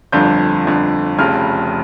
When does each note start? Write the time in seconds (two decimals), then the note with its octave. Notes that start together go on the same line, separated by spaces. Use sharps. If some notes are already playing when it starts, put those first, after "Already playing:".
0.12 G1 F2 D3 G6
0.65 G1 F2 D3
1.18 F1 F2 C#3 F6